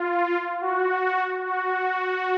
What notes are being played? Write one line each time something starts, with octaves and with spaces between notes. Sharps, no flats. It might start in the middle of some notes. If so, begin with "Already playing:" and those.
Already playing: F4
F#4
F#4